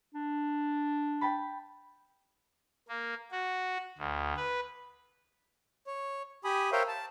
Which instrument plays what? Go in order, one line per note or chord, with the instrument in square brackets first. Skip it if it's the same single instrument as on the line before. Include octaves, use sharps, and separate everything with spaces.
[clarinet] D4
[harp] G5 A5 B5
[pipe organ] A#3
F#4
D2
B4
[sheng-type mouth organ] C#5
G4 G#5 B5 D#6
A#4 C5 C#5 E5 F5 G5
A5